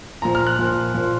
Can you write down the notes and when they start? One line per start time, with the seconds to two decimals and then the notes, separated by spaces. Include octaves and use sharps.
0.22 A#2 F3 A#5
0.35 F6
0.47 F#6
0.59 A#2 F3
0.94 A#2 F3